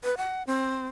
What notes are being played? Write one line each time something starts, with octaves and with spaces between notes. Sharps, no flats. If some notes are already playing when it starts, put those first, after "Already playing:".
B4
F#5
C4